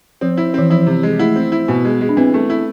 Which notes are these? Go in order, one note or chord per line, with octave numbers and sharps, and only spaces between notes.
F3 C4
E4
E3 C4
F3 E4
C3
G#3
A3 E4
C4
E4
B2 B3
G#3
G#3
D4
E3 C4
A3
E4